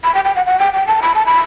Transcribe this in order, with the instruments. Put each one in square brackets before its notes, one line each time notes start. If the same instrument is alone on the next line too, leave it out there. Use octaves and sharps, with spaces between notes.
[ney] B5
G5
G5
F#5
F#5
G5
G5
A5
B5
A5
B5